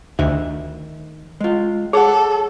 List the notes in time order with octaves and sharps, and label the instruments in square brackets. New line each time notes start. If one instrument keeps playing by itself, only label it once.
[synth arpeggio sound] D2 [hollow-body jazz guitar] D#3 E5
[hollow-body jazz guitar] G#3 F4
[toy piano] G#4 [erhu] A4 [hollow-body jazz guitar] C#5 F#5